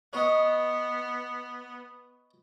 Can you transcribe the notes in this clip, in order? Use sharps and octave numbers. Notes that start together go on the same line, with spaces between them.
B3 C#5 D#5